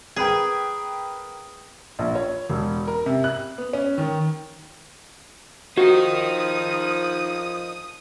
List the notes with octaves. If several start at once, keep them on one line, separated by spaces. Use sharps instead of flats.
G#4 A#4 B4 G5
A#1
C#5
E1
A#4
C3
F#6
B3
C#4
D#3
F3 D#4 F#4 A#4 D#6